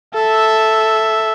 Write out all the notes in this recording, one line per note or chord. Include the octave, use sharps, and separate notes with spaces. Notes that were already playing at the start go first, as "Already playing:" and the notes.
A4 E5